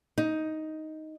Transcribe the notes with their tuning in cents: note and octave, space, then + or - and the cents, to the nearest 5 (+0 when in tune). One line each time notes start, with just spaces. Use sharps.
D#4 +5